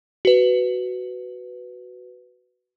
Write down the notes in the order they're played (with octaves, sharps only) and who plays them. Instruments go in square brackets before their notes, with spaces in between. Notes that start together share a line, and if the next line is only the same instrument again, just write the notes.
[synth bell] F#4 B4